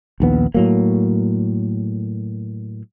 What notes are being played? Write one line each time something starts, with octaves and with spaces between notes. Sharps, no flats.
A#1 D#2 B3
A2 F#3 A#3